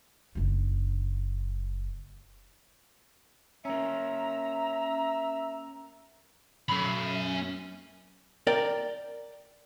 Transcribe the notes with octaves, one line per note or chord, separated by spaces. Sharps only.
F#1 D4
A#3 C#4 E5 A#5
F#2 C#4 B5
A#4 D5 G5